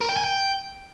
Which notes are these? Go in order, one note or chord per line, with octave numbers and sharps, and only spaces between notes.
A#4
G5
G#5
G5